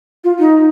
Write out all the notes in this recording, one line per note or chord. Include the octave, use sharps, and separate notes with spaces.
F4
D#4